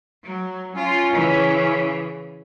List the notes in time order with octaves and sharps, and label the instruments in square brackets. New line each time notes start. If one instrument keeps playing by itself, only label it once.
[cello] F#3
[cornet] C#4 [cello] F4
[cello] C#3 E3